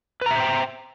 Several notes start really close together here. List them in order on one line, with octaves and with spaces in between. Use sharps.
B4 A#5 E5 C5 G5